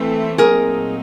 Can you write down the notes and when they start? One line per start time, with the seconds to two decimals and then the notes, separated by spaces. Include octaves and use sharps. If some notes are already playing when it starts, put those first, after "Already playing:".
Already playing: E3 A3 C4 A4
0.38 A#2 F#3 A3 C4 D#4 G#4 A#4